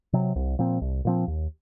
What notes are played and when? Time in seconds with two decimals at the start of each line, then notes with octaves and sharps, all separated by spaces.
0.13 C3 F#3
0.36 C2
0.59 A#2 F3 C4
0.81 C2
1.05 A#2 F3 C4
1.28 D#2